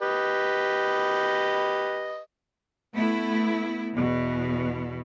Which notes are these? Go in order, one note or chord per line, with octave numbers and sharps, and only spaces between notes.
G4 B4 D#5
A3 B3 E4
E2 B2